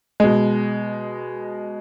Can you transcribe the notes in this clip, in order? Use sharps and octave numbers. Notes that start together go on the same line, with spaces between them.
B2 G#3